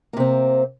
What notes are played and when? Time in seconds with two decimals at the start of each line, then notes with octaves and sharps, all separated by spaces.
0.13 A#3
0.17 C3
0.20 C4